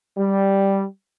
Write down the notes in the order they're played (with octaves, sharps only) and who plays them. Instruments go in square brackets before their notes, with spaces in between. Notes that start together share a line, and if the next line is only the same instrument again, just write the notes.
[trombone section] G3